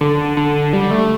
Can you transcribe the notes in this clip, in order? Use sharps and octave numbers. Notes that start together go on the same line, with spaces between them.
D3
D3
G3
A3